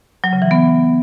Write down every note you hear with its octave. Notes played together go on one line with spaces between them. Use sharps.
F#3
C#3
E3
B3